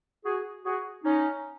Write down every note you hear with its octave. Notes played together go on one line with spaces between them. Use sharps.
F#4 G#4
F#4 G#4
C#4 D#4